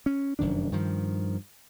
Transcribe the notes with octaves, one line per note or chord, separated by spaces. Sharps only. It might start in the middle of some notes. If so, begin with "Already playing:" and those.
C#4
F1 F#2 D#3 D4
G2 D#3 F3